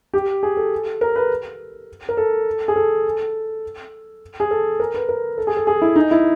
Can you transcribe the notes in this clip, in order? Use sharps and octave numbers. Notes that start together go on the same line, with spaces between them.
G4
G#4
A4
A#4
B4
A#4
A4
G#4
A4
G#4
A4
A#4
B4
A#4
A4
G#4
A4
G#4
E4
D#4
E4